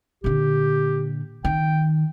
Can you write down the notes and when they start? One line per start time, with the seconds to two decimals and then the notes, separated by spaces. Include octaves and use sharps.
0.24 A#2 D3 G4
1.45 D#3 G5